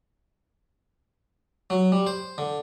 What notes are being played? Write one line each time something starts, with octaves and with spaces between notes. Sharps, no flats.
F#3
G3
C5
D3